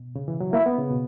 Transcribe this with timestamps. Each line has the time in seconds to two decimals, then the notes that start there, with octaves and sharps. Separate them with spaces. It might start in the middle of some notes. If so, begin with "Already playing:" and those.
Already playing: B2
0.16 C#3
0.28 E3
0.40 F#3
0.53 A#3 E4
0.66 B3
0.78 C#3
0.91 B2